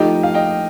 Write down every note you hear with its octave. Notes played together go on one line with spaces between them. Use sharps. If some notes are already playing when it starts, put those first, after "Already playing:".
Already playing: F3 A3 D#4 G4 D#5 G5
F5
D#5 G5